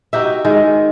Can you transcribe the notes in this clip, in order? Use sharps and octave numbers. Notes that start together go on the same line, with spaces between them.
D#4 F#4 G4 E5
D#3 G#3